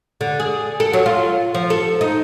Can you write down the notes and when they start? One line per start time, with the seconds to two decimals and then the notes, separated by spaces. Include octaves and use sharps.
0.21 D3
0.40 G#4
0.80 A4
0.93 F#3
1.06 F4
1.55 F3
1.70 A4
2.01 D#4